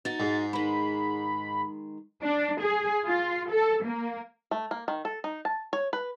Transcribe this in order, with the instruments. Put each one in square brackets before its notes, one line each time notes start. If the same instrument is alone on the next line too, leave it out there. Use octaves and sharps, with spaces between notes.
[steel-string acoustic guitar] D#4 F#4 [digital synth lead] A6
[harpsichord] G#2
[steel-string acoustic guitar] D#3 G#3 [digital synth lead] B5
[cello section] D4
G#4
F4
A4
A#3
[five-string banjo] A3
A#3
D#3
A4
D#4
A5
C#5
B4